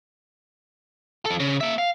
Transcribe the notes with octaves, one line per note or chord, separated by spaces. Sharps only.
F3 A4
C#3
A#3 E5
F5